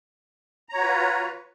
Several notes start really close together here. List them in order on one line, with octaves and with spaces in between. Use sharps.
A#5 C#5 F#4 B4 F4